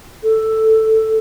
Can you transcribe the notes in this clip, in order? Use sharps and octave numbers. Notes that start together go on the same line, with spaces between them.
A4